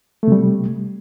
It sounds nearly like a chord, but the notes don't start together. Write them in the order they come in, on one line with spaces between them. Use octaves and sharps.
A3 C3 G3